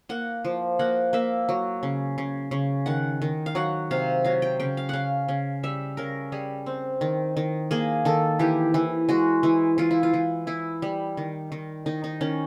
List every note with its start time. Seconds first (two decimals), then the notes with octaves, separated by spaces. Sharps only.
0.09 A#3 F#5
0.45 F3
0.79 A#3 F#5
1.13 A#3 E5
1.49 F#3
1.83 C#3
2.18 C#3
2.51 C#3
2.86 D#3 F#5
3.22 D#3
3.46 F5
3.55 F#3 F#5
3.91 C3 F5
4.24 F#3 F5
4.42 G5
4.60 C#3 G5
4.77 F5
4.89 C#3 F5 F#5
5.29 C#3
5.63 G3 E5
5.97 C#3 A#4
6.32 G3 G#4
6.66 C4
7.01 D#3
7.37 D#3
7.71 A#3 G#4
8.05 D#3 A4
8.39 E3 G4
8.74 E3
9.09 G#3 F#4
9.43 E3
9.78 E3 F4
9.91 E4
10.03 F4
10.14 E3
10.47 E3 E4
10.82 G3
11.17 D#3
11.52 D#3
11.86 D#3 D#4
12.04 D#4
12.21 D#3 C#4